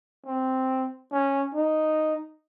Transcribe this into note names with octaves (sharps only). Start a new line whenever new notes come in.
C4
C#4
D#4